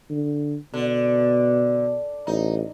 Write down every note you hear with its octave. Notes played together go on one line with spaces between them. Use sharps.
D3
B2 D3
A1 D#4